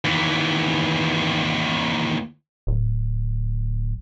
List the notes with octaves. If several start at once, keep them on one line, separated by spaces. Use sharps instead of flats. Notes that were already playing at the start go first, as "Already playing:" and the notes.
D#2 E3
D1